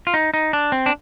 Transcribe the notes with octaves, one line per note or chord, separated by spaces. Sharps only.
F4
D#4
D#4
D4
C4
D4